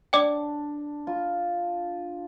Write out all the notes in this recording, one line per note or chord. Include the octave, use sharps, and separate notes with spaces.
D4 D5 G5 D6
F4